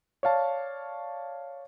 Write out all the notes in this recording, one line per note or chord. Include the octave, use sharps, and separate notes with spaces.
C#5 D5 F5 A5